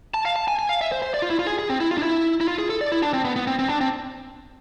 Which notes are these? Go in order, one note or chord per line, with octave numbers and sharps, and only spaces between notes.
A5
F5
A5
G#5
G#5
F5
E5
C5
C5
D5
F4
E4
F4
G#4
G#4
C4
E4
F4
D4
E4
E4
F4
G#4
A4
D5
E4
D4
C4
B3
B3
C4
C4
D4
C4